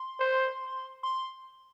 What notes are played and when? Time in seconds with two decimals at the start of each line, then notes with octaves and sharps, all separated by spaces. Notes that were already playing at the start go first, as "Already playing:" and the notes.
Already playing: C6
0.20 C5
1.03 C6